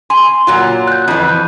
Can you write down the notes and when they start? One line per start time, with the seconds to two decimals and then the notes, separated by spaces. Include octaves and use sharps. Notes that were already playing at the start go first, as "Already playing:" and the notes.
0.10 G#5 C6
0.47 A#2 F#3 F4
0.88 F#6 G6
1.08 F2 E3